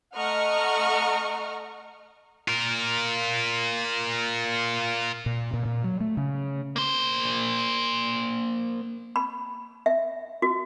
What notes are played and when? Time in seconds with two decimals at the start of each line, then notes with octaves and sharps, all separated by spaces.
0.15 A3 D#5 F#5 A#5 C#6 F6
2.48 F4 A#4
5.26 A#2
5.53 A#2
5.65 A#2
5.84 F#3
6.01 A3
6.17 C#3
6.76 A#3 C5
9.16 B5
9.86 E5
10.42 F#4